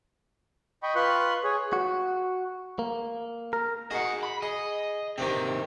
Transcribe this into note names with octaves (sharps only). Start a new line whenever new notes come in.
D#5 G5 B5 C#6
F4 B4 C6 C#6 F#6
G#4 C#5
F#4
A#3
A#4
D#4 F#4 G#4 D#5 F#5
B5
G#4 D#5
C3 D#3 C4 D4 G4